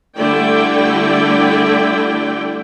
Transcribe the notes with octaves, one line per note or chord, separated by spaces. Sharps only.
D3 G3 A3 E4 D5 G5